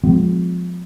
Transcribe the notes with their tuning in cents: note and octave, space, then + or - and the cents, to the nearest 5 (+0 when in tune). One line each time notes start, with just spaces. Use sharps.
F3 +25 G#3 +0 C4 -40